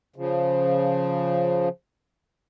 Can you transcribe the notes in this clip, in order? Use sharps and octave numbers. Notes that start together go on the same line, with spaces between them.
C#3 F3